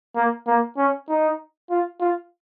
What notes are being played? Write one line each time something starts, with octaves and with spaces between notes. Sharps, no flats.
A#3
A#3
C#4
D#4
F4
F4